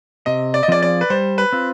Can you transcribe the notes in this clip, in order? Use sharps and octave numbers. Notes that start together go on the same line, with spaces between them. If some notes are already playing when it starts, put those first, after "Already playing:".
C3 D#5
D5
D#5
F3 C4 F4 G#4 D5
D5
B4
G3 C5
B4
C4 F4